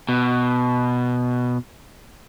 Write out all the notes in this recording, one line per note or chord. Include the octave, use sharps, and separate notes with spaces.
B2